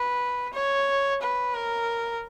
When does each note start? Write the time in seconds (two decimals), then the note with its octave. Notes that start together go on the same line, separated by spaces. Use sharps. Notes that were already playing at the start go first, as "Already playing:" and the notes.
Already playing: B4
0.54 C#5
1.22 B4
1.54 A#4